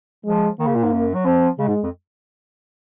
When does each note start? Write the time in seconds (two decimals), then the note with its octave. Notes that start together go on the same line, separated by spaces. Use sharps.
0.25 F3 G#3
0.59 D#3 A#3
0.67 C#3
0.75 A#2
0.84 G#2
0.92 F#2
1.14 F#3
1.25 F3 C4
1.59 C#3 G#3
1.68 G#2
1.83 F2